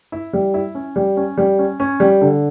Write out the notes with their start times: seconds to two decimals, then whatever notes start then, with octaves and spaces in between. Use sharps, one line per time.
0.12 E4
0.33 G3
0.54 E4
0.75 C#4
0.96 G3
1.17 C#4
1.38 G3
1.59 C#4
1.80 C#4
2.00 G3
2.21 D3